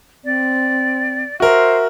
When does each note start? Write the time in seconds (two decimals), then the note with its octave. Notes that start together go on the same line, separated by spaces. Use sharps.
0.24 C4 D5
1.40 F#4 A#4 C5 E5